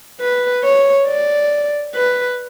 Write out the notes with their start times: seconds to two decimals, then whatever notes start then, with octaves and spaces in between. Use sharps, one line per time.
0.20 B4
0.64 C#5
1.07 D5
1.95 B4